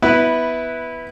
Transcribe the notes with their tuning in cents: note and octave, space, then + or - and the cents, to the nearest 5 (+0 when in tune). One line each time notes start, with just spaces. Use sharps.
B3 +0 E4 -15 B4 +0